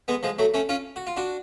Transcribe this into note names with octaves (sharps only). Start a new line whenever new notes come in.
G#3 B3
F3 G#3
F#3 A3
A3 C#4
C#4 F4
F#4
F4
D4 F#4